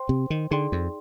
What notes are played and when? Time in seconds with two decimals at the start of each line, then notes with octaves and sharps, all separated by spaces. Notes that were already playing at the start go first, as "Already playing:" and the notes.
Already playing: C5 G5 C6
0.09 C3
0.30 D#3
0.51 D3 D#4 G#4 D5 G5 C6
0.72 F2